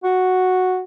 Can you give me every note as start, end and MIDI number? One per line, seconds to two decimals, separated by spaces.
0.04 0.82 66